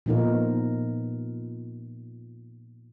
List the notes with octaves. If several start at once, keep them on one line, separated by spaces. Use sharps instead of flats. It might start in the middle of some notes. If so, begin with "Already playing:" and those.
A#2 F3 B3 D#4 F4 A#4